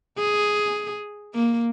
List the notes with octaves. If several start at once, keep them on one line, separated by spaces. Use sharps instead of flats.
G#4
A#3